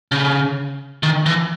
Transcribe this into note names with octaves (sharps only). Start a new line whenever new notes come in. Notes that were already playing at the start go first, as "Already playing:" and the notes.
C#3
D#3
E3